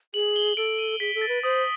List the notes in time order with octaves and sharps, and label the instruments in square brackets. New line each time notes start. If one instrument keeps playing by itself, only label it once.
[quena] G#4 [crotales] F#7
[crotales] G7
[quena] A4 [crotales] D7
[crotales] D#7
[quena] G#4 [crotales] B6
[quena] A4
[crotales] A6
[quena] B4
[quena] C5 [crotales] D#6